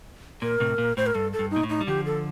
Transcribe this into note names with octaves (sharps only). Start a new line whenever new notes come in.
A#2 A#4
A2 C3
A#2
A2 C5
A#4
G2 A4
A4
G2
D#4
A#2
A2
D#4
G3
D3 F3 G4
A4